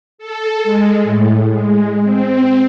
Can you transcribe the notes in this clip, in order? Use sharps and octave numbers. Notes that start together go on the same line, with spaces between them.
A4
G#3
A2
G#3
C4